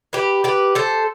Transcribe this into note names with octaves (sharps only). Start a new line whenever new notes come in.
G4 B4
G4 B4
A4 C5